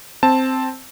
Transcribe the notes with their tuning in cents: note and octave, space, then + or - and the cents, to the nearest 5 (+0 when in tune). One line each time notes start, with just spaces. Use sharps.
C4 +0 A5 +0